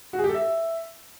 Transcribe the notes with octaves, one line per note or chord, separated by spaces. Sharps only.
F#4
G#4
G4
A4
E5